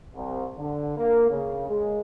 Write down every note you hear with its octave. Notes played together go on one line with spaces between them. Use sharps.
C2
D3
A#3
C#3
G#3